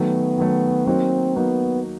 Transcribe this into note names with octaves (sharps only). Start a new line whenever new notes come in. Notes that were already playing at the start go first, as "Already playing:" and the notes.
Already playing: D#3 F#3 A3 B3
D#3 F#3 A3
F#3 A#3 C4 D#4 F#4
F#3 A#3 B3 D#4 F#4